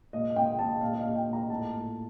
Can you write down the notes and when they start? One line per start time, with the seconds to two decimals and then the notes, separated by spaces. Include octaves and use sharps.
0.13 A#2 D#5
0.36 A#2 G5
0.59 A#2 A5
0.81 A#2 F5
0.93 D#5
0.99 F5
1.04 A#2
1.16 G5
1.28 A#2
1.33 A#5
1.49 A2 A5
1.73 A2